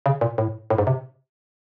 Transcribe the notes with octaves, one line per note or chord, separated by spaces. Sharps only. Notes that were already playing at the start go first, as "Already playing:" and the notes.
C#3
A#2
A2
A2
G#2
C3